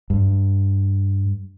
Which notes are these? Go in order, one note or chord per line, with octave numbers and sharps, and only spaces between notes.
G2